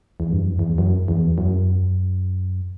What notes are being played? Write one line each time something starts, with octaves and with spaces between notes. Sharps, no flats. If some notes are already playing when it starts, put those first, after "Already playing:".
E2
G2
F#2
E2
F#2
E2
F#2